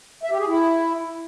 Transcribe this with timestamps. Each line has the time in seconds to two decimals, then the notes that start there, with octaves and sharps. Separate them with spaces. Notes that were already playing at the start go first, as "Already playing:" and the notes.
0.23 E5
0.31 G4
0.39 G#4
0.47 E4